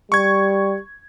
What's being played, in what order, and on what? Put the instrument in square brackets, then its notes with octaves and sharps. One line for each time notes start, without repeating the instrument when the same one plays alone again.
[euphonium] G3 [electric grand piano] C#6 G#6